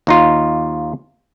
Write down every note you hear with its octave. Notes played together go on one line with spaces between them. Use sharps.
D#2 D#4 F4